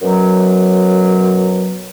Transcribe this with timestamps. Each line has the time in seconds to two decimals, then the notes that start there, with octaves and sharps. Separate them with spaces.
0.02 F#2 B2 F#3